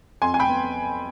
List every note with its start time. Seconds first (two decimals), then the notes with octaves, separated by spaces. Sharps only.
0.22 F2 G#5 C6
0.34 G#5
0.40 G5 B5
0.49 B3